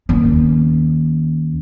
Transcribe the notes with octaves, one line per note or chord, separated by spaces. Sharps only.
D#2 C#4